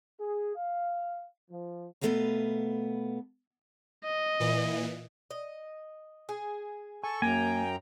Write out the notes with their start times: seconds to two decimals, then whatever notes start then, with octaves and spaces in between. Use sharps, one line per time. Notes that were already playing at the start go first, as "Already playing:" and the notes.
0.19 G#4
0.56 F5
1.50 F3
2.01 B2 G#3 A3 B3 F5 A#5
4.04 D#5
4.40 A#2 E3
5.31 D#5
6.29 G#4
7.04 A4 G#5 C#6
7.22 F#2 A#3 G5 G#5 A#5